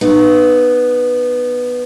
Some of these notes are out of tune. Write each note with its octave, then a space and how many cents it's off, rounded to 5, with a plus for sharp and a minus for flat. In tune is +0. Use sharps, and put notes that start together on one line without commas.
B3 +0 D#4 -35